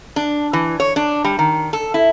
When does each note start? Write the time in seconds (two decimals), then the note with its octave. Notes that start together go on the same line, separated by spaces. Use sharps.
0.16 D4
0.53 E3
0.80 C#5
0.96 D4
1.24 G3
1.39 D#3
1.73 A4
1.94 E4